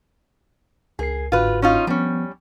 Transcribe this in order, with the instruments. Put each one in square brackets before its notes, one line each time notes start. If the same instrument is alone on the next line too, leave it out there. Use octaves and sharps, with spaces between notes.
[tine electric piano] C#2 A#4 C7 [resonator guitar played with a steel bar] G#4
[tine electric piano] G1 G#2 F#4 [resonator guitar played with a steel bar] F4 B4
[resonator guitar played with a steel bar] C#4 D#4 F4
[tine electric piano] F3 B3 [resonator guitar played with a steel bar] G3 C#4